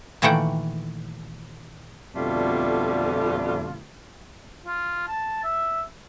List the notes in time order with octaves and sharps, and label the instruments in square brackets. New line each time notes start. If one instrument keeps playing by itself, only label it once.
[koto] A#2 D#3 E3 A3 F#5 G5
[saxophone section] F2 B2 D3 G3 A3 F4
[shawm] F4
A5
E5